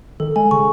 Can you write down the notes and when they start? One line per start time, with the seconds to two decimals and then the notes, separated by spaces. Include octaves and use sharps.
0.20 D#3 A4
0.36 G#3 G#5
0.51 C#3 C#6